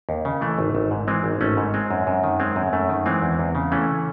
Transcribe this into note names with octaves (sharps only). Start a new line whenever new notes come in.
D#2
C#3
E3 A3
G#1
G#1
G#2
E3 G#3 C4
G#1
G#1 A3 C#4
G#2
G#3 C4
F#2
F#2
D#3
G#3 C4
F#2
F#2 A3
D#3
E3 G#3 C4
E2
E2
C#3
E3 A3 C#4